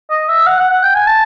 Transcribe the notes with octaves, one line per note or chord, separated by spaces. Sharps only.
D#5
E5
F#5
F#5
F#5
G5
G#5
A5